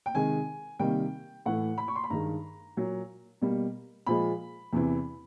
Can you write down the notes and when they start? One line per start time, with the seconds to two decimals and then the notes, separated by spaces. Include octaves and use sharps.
0.06 G5
0.14 C3 D#3 G#3 G#5
0.80 C3 D#3 G3 A#3 G5
1.46 A2 E3 A3 F#5
1.78 B5
1.88 C#6
1.96 C6
2.04 B5
2.10 G2 D#3 G#3 A#5
2.77 A#2 F#3 A#3
3.42 B2 G3 A#3
4.06 A#2 F3 G#3 B5
4.73 E2 C3 E3